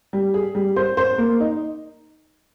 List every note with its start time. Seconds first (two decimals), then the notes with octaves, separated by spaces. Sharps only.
0.13 G3
0.34 G#4
0.55 G3
0.76 C5
0.97 C5
1.18 A#3
1.40 D#4